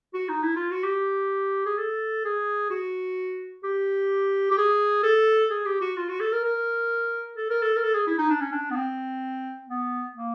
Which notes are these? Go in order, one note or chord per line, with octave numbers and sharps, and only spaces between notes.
F#4
D#4
E4
F4
F#4
G4
G#4
A4
G#4
F#4
G4
G4
G#4
A4
G#4
G4
F#4
F4
F#4
A4
A#4
A#4
A4
A#4
A4
A#4
A4
G#4
E4
D#4
D4
C#4
D4
B3
C4
B3
A#3